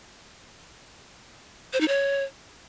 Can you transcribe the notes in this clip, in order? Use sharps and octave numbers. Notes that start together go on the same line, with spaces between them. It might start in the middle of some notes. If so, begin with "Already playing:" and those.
C5
D#4
C#5